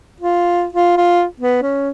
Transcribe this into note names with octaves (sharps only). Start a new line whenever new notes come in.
F4
F4
F4
B3
C#4